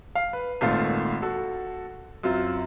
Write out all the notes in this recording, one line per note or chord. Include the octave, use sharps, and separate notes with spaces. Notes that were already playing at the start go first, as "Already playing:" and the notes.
F5
B4
G#1 A#2 D#3 A3 F4 F5
F#4 A4
F#2 F#3 C4 F4